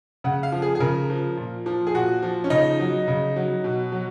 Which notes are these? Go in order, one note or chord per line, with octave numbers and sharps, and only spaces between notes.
C#3 F#5
F5
F3
G#4
G#4
C#3 A#4
F3
A#2
F3
G#4
A#2 F#4
F3
C#4
C#3 D#4
F#3
C#3
F#3
B2
F#3